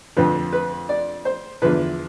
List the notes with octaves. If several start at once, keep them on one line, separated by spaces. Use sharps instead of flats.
F2 D3 F3 B4
B4
D5
C5
E2 D3 F3 B4